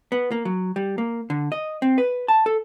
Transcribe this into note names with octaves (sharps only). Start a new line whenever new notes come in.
B3
A#3
F#3
G3
A#3
D3
D#5
C4
B4
A5
A4